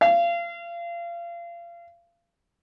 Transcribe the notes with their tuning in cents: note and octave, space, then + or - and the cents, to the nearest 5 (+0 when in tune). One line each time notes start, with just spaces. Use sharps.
F5 -30